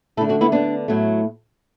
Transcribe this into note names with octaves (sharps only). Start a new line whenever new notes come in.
D3 A3 E4 A4
D4 F#4
B3 E4
D3 B3 D4
A2 F#3 A3